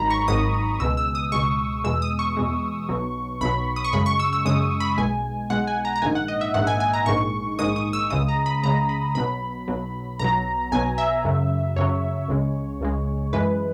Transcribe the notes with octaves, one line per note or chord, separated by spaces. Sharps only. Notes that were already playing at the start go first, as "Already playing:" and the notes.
Already playing: G#1 G#2 D#3 F#3 A#5 B5
C#6
G#1 G#2 D#3 F#3 D#6
C#2 B2 G#3 E6
E6
D#6
C#2 B2 G#3 C#6
E2 B2 G#3 E6
D#6
C#6
E2 B2 G#3
B1 B2 F#3
B1 B2 F#3 B5
D#6
C#6
F#2 C#3 G#3 B5
C#6
E6
E6
F#2 C#3 G#3 D#6
B5
B1 B2 G#3 G#5
B1 B2 G#3 F#5
G#5
A#5
A#5
A#1 G#2 D#3 G#5
F#5
D#5
E5
A#1 G#2 D#3 F#5
G#5
G#5
A#5
A#1 G#2 D#3 G#3 C#6
A#1 G#2 D#3 G#3 D#6
D#6
E6
C#2 C#3 G#3 D#6
A#5
B5
C#2 C#3 G#3 A#5
B5
B1 B2 F#3 B5
B1 B2 F#3
B1 B2 F#3 A#5
B1 B2 F#3 G#5
E5
F#2 C#3 F#3
F#2 C#3 F#3 C#5
C#2 C#3 G#3
C#2 C#3 G#3
F#2 E3 G#3 B4